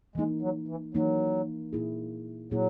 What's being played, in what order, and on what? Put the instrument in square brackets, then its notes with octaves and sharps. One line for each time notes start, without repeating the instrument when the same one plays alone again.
[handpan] E3 A#3 D#4 [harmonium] G#3
[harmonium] F#3
E3
[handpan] E3 A#3 D#4 [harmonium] F#3
[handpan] A#2 A#3 E4 G#4
[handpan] A#2 A#3 E4 G#4 [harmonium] F#3